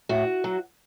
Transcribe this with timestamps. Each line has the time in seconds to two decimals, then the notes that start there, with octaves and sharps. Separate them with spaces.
0.09 A2 F#4
0.44 F#3